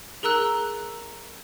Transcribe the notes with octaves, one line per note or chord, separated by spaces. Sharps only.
G#4 A#4 A#5 E6 F#6